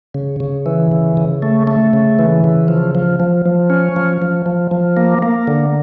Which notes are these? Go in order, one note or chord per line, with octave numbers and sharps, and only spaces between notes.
C#3
C#3
E3
C#3
C#3
A3
A3
C#3
E3
C#3
F3
F3
F3
F3
C#4
F3
F3
F3
F3
A#3
A#3
D3